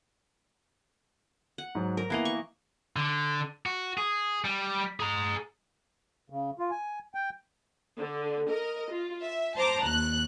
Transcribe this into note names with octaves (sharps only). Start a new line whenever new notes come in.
F#5
G#2 F#3
A#4
E3 A#3 B3 D#5 C7 F7
C#6
D3
F#4
G#4
G3
G#4 A#5
C#3
F4
G#5
G5
D3
A#4 D#5
F4
E5
C5 A5 A#5 D6
D#2 F#6